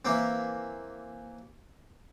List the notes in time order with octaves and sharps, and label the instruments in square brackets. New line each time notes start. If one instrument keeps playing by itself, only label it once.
[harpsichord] E3 A#3 C4